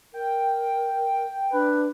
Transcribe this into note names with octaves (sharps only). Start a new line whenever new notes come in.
A#4 G5
D4 B4